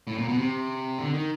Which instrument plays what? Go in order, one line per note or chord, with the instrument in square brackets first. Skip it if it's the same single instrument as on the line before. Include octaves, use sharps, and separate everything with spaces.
[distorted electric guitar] A2
A#2
B2
C3
D3
D#3